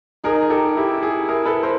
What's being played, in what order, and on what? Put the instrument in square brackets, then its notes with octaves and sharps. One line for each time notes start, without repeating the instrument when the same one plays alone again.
[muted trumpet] D#4 [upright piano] G#4 A#4
[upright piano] G4 A4
[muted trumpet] E4 [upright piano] G4
[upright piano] G#4
G#4 A#4
A4 B4
A#4 C5